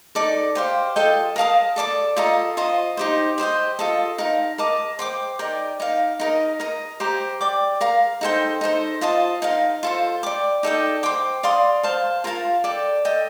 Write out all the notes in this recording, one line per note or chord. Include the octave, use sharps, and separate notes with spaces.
D#4 A4 D5 A5
G4 C5 F5
F4 A4 D#5 G5
A#4 F5 A5 D#6
A4 D5 A5 D6
F4 A4 D#5 A#5
F4 C5 D#5 A#5
D#4 G4 C5
G4 C5 D#5 G5
F4 A4 D#5 A5
D#4 A#4 F5
A#4 D#5 A5 D6
C5 G5 D6
D#4 A#4 D5 G5
D#4 A#4 F5
D#4 A#4 D#5
A#4 D#5 A#5
G4 C5 G5 A#5
D5 G5 D6
A#4 F5 A#5
D#4 A4 C5 G5
D#4 A4 C5
F4 C5 D#5 A5
D#4 A#4 F5
F4 A4 C5
D5 G5 D6
D#4 A4 D5 G5
C5 G5 D6
D5 F5 C6 D#6
C5 F5 A5 C6
F4 A#4 F5 A5
A4 D5 G5
A4 D#5 G5